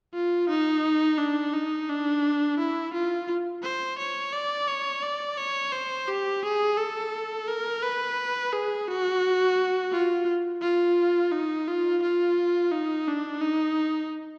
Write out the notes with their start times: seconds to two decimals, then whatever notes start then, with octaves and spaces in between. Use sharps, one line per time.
0.14 F4
0.49 D#4
1.17 D4
1.54 D#4
1.88 D4
2.58 E4
2.93 F4
3.63 C5
3.98 C#5
4.33 D5
4.68 C#5
5.03 D5
5.37 C#5
5.72 C5
6.08 G4
6.43 G#4
6.77 A4
7.48 A#4
7.83 B4
8.52 G#4
8.88 F#4
9.92 F4
10.62 F4
11.32 D#4
11.68 F4
12.02 F4
12.72 D#4
13.08 D4
13.42 D#4